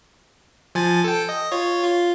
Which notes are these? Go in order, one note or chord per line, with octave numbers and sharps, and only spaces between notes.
F3 G#5 A6
A4 G5
D#5
F4 C#5
F4